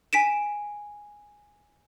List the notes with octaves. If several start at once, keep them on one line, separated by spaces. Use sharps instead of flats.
G#5 B6 D7 E7